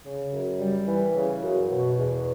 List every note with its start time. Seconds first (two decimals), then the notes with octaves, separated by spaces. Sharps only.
0.05 C#3
0.33 F#2
0.60 G3
0.88 E3
1.15 C#3
1.43 F#2
1.70 B2
1.98 E2